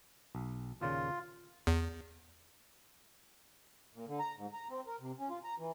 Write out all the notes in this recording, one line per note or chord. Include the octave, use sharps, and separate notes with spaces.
B1
D#2 A#2 C#3 F4
E2
A#2
D3
A#5
G#2
A#5
C4
A#4
C3
C#4
F4
A#5
E3